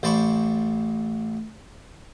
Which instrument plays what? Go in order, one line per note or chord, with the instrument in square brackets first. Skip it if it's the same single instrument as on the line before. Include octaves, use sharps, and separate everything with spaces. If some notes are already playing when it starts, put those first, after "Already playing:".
[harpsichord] A1 C5 D5 A5 B5 C#6